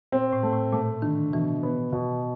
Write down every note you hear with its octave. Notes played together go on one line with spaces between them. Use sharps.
A#2 C4
A2
A3
A2
A#2 A3
D3 D#3
B2 E3
B3
B2